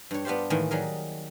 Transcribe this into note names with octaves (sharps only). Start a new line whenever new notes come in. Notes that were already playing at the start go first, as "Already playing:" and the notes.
G2 C#5
B3 D4 F4 G4 C5
A2 D#3 E3 G#3 A#3
F#3 G3 D#4 G#4 A#4